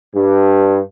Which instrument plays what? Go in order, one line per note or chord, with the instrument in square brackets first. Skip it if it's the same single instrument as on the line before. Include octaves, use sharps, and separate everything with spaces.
[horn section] G2